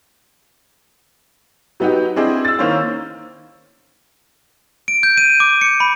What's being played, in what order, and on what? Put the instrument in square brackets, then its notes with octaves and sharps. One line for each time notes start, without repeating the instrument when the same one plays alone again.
[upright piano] F#3 B3 D#4 F#4 G4
C4 D4 E4 G#4 D#5
E6 A6
D#3 A#3 C#4 E4 C5
[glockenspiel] D7
G6
D#7
D6
C#7
B5